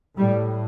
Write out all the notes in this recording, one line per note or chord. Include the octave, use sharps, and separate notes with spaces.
A2 G3